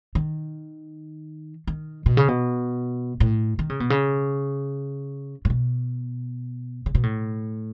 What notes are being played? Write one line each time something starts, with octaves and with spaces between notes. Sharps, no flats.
D#3
D#3
B2
C#3
B2
A2
D#3
C#3
B2
C#3
A2
B2
C#3
B2
A2